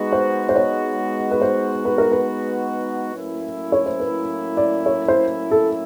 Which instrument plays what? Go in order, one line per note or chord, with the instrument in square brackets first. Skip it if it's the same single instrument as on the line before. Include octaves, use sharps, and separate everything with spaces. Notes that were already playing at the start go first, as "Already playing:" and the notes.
Already playing: [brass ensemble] G#3 B3 D#4 F#4
[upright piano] C5
C5
C#5
B4
C5
B4
A#4
B4
[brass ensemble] A2 F#3 A#3 C#4 E4
[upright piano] C#5
C5
B4
D5
C#5
C5
A4